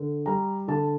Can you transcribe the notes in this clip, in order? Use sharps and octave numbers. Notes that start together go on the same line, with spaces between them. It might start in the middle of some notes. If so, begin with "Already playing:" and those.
Already playing: D3
G3 A#5
D3 A5